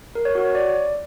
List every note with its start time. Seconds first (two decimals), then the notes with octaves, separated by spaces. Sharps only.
0.15 A#4
0.25 C#5
0.35 F#4
0.45 C#5
0.55 D5